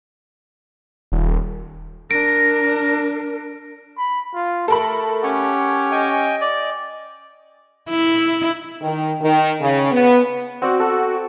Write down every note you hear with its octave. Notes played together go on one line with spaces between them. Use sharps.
D#1
D4 A#4 A#6 D7
B5
F4
A3 A4 A#4 B5
C#4 G4 F#5
D#5 G5 G#5
D5
E4
D#3
D#3
C#3
B3
C4 F#4 D5 F#5
A4